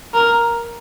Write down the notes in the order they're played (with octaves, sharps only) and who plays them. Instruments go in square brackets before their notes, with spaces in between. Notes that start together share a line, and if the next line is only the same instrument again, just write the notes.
[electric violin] A#4